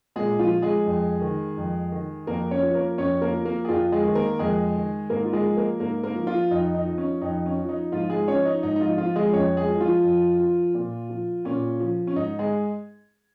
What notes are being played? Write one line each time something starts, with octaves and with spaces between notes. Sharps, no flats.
A#2 G#3 G#4
F3 F4
F3
G#3 G#4
F2
D#3
F2
D#3
F2 A#3 A#4
C#4 C#5
F3
A#3 A#4
F2 C#4 C#5
A#3 A#4
F3
A#3 A#4
G#4
F2 F3 F4
G#3 G#4
D#3
A#3 A#4
F2 G#3 G#4
D#3
G#2 A#3 A#4
F4
G#3 G#4
F3
A#3 A#4
G#2 A#3 A#4
A#3 A#4
F3
F3 F4
F2 D#4
D#4
F3
C#4
F2 D#4
C#4
F3
D#4
G#2 F3 F4
G#3 G#4
F3 C#4 C#5
D#4
G#2 D#4
D#4
F3 F4
F3 F4
G#3 G#4
F2 C#4 C#5
G#3 G#4
F3
F3 F4
F2
F3
A#2
F3
A#2 C#4
F3
C#4
G#2 D#4
G#3 G#4